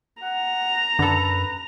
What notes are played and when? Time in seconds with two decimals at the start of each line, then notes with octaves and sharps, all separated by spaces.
0.22 F#5 A#5
0.99 F#2 D3 A4 B4